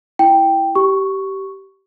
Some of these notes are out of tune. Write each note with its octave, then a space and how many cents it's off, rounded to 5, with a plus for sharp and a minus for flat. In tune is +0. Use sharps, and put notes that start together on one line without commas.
E4 +0 G5 +0
G4 -20 C#6 +0